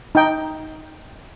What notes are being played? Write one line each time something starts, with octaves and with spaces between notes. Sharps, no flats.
D#4 G5